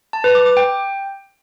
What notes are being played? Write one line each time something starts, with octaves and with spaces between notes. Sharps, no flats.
A5
B4
D6
D6
G5